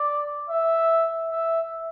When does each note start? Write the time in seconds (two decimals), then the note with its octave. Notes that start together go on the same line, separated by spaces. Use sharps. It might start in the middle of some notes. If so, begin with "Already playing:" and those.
Already playing: D5
0.49 E5
1.32 E5